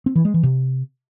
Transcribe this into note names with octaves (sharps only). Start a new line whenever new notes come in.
C4
E3
G#3
E3
C3